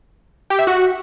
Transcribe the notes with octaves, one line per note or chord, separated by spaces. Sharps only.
G4
E5
F#4